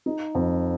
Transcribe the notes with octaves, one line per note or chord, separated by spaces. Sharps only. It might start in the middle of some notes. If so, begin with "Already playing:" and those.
D#4
F2